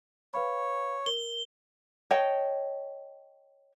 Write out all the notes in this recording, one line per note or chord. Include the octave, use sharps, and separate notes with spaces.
B4 C#5 F5 B5
A#4 G7
C#5 D#5 G5 A5